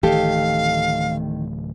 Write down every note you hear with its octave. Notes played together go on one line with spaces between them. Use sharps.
D1 D#3 E3 A3 G4 A4 F5